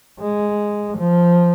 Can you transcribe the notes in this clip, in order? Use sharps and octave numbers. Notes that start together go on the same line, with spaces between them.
G#3
F3